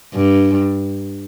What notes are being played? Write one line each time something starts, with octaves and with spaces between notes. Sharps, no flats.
G2